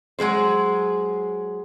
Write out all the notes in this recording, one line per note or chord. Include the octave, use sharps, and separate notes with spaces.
F#3 G#3 G#4 C5